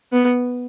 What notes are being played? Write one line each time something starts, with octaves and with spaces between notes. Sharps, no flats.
B3